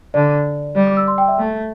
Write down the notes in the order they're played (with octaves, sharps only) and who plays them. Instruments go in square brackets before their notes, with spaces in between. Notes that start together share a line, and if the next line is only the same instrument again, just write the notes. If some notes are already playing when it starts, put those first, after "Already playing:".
[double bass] D3 [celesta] D5
[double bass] G3 [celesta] D5
[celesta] D6
E6
C6
G5
E5
[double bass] A3